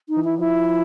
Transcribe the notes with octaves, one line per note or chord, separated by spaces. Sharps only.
D#4
E3
E4
F3 E4